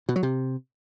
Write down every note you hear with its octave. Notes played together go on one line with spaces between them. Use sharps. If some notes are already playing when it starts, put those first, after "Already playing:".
B2
F#3
C3